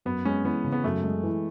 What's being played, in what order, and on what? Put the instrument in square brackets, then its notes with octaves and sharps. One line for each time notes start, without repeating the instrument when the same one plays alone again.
[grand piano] F#2 [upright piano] B3
[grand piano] G#3 [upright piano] C#4
[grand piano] E3 [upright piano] B3
[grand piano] C#3
[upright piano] B3
[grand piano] F#2 [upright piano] A3
[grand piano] G#3
E3